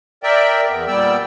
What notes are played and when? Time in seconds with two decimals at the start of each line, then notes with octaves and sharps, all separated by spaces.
0.23 A#4 D5 E5 G5
0.69 E2 B3
0.88 A#2 G3 B3 D5 G5 E6